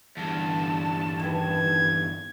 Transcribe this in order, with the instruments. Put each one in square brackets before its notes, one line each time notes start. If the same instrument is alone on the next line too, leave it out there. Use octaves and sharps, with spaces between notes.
[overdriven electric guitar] E2 G2 [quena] A5
[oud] D#3 E3 B4 [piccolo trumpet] G#6